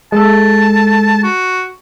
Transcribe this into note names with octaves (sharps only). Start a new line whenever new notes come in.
G#3 A4 A5
F#4